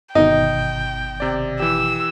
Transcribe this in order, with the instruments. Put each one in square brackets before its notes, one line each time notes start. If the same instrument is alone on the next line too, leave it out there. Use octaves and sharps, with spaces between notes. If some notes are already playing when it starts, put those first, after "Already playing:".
[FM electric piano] G1 B2 D#3 [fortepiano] D#4 [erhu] G5
[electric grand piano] C3 D5
[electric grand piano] E3 G4 [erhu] E6